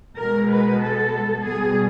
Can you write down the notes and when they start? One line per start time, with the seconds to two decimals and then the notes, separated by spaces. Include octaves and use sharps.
0.17 B2 G#3 A#4
0.48 B4
0.79 A4
1.42 B2 G3 G#4